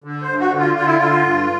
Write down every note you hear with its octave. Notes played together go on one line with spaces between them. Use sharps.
D3
C5
G2
F#4
D3
F4
D3 F4
E4
D3 F4
G2